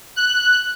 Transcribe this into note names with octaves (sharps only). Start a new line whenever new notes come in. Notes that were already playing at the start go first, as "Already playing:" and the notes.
F#6